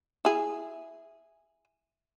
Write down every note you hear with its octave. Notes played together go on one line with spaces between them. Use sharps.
E4 G#4